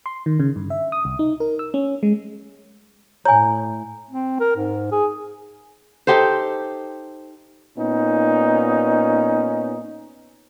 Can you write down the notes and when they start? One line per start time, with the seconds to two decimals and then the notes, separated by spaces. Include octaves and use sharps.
0.06 C6
0.26 D#3
0.40 C#3
0.56 G2
0.70 E5
0.92 D#6
1.05 C2
1.19 D#4
1.40 A#4
1.59 E6
1.74 C#4
2.03 G#3
3.25 A2 C#5 G#5 A#5
4.11 C4
4.40 A#4
4.56 G#2
4.92 G#4
6.07 D#4 G4 A4 C5
7.77 A#2 B3 C#4 D#4